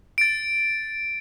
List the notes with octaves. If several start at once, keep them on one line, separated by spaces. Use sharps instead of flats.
A6 D7